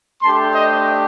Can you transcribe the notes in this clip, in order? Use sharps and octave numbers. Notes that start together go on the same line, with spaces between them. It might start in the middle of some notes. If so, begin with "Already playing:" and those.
A3 D4 G4 A5 C6
C5 D#5